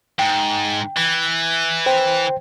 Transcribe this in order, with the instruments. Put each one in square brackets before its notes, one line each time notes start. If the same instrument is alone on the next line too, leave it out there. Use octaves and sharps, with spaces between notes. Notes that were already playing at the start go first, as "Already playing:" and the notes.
[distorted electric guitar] G#2 [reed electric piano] G5
[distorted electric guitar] E3
[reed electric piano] C5 G5